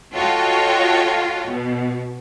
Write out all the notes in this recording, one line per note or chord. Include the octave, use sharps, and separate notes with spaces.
F4 F#4 A4 C#5 D#5 G5
B2